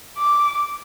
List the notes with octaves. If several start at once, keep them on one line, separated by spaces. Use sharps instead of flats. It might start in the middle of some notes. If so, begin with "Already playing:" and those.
D6